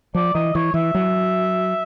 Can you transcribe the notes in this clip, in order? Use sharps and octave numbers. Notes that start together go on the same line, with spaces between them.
F3 D5
E3 D#5
E3 C#5
E3 E5
F#3